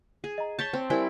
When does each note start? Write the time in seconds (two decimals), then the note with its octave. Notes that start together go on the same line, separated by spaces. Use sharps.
0.24 G#4
0.38 D#5 A#5
0.59 C#5 A5 G6 B6 G7
0.73 C4
0.90 G3 E4 A#4 C5 G5 G#5